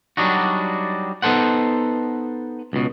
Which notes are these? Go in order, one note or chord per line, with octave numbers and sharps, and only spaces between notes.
F#3 G3 D4 D#4 F#4
B3 D#4 A4 C5 F#5
C#2 B2